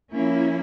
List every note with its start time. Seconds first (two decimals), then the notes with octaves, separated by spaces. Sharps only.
0.13 F3 A#3 C#4 E4